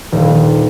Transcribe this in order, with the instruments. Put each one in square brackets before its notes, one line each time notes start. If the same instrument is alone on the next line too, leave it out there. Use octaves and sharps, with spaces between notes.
[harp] D#1